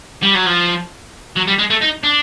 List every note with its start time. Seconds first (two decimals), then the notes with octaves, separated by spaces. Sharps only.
0.23 G3
0.35 F#3
0.47 F3
1.36 F#3
1.47 G3
1.59 G#3
1.70 A3
1.81 D#4
2.03 D4